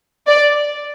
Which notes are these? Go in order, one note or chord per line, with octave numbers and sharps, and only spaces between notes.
D5